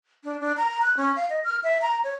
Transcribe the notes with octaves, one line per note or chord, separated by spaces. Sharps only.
D4
D4
A#5
F#6
C#4
F5
D#5
F6
E5
A#5
C#5